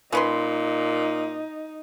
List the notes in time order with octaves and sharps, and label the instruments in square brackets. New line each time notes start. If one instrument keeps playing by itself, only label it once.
[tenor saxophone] A#2 [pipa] C#4 B4 C6 [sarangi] D#4